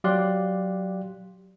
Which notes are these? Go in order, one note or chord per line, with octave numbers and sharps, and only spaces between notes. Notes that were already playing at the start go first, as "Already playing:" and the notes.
F#3 G4 D5 F5 C6 F#6